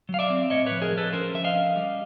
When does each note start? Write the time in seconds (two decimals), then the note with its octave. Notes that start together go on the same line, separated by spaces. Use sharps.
0.09 F#3
0.14 F5
0.19 D5 E5
0.30 C4
0.50 A2 C#5 D#5
0.66 F3 B4 C#5
0.82 G#4 A#4
0.92 F3
0.98 A4 B4
1.13 C#4 A#4 C5
1.34 F3 E5
1.44 D#5 F5
1.55 C#4
1.76 G3